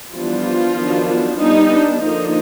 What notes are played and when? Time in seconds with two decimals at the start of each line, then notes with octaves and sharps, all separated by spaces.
0.13 E3 F3 G3 B3 D4 F4
0.77 D#3 F#3 B3 D4
1.39 G3 B3 D4 D#4
1.70 D4
2.02 D3 F3 A#3 D4 D#4